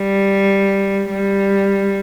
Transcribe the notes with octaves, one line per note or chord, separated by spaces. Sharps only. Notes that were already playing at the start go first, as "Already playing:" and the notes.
Already playing: G3
G3